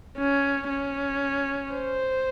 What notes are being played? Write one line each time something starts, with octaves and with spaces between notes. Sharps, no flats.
C#4
C#4
C5